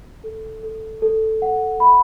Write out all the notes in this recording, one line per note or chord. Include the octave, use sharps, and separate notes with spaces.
A4
A4
A4
F#5
B5